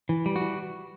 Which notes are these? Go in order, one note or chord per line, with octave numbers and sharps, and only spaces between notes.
E3
G3
F#4
E3